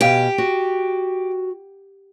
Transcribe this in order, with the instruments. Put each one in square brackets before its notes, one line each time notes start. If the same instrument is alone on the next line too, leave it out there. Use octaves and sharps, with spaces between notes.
[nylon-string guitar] B2 F5 G#5 [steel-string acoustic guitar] G4
[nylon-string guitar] F#4